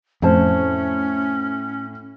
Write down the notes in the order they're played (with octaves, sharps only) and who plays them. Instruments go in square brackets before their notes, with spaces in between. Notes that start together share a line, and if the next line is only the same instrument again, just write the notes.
[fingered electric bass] F2 [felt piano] A2 [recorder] C#4 [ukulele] E4 C5 A5